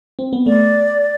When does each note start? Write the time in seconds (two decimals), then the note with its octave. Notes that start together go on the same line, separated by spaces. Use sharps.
0.19 C4
0.33 B3
0.46 A3 D5